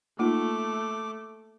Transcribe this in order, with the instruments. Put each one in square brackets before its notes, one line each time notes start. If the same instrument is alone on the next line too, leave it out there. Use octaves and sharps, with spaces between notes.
[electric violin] A3 [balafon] A#3 D#4 F4 [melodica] D6